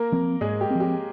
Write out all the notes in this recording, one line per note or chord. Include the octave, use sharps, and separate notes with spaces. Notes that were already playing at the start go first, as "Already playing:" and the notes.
Already playing: A#3 A#4
F3 C4
G#2 G#3 G#4
G4
F3 C4
G4